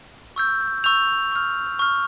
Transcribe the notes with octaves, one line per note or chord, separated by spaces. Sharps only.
C#6 E6 G6
C#6 E6 G6 F7
C#6 F6
C#6 F6